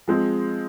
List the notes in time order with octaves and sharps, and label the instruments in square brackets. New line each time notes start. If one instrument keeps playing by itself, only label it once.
[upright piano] F3 G#3 C4